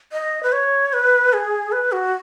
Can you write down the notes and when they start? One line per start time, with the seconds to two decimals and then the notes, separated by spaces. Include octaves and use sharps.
0.13 D#5
0.43 B4
0.52 C#5
0.93 B4
1.33 G#4
1.72 B4
1.92 F#4